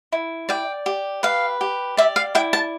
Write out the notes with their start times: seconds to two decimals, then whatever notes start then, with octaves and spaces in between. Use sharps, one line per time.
0.12 E4
0.49 D5 G5
0.86 G4
1.23 B4 F5
1.61 G4
1.97 D5 E5
2.16 F5
2.35 E4 G5
2.53 A5